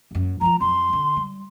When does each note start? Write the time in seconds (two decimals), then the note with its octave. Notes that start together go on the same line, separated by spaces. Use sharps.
0.11 F#1 F#2
0.41 F3 F4 A#5
0.60 F2 F#3 C6
0.93 D3
1.17 G3